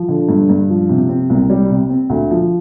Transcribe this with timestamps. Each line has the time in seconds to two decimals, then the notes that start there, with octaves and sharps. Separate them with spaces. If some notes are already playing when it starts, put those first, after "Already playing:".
Already playing: F3
0.08 D3
0.28 G2
0.49 G2
0.70 F3
0.89 C3
1.09 C4
1.30 C2
1.50 G3
1.70 C3
1.90 C4
2.10 D2
2.31 F3